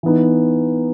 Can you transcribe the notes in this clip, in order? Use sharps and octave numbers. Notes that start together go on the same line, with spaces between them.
E3 B3 D#4